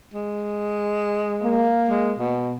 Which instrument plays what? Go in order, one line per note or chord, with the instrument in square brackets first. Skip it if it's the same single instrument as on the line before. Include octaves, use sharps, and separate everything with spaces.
[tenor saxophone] G#3
[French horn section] A#3
[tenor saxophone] G#3
B2